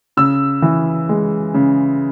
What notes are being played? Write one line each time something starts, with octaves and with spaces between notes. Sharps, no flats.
C#3 E6
E3
G#3
C#3